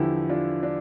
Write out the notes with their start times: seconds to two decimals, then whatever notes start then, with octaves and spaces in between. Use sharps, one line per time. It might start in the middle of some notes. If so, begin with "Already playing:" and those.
Already playing: E2 D3 F3 E4 G4
0.29 D4 F4
0.63 D4